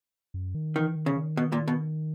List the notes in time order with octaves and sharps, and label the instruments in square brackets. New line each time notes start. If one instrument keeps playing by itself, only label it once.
[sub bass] F#2
D#3
[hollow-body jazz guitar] D#3 [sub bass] E3
[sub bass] D#3
[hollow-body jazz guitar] C#3
[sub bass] D#3
[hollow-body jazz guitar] B2
A#2
B2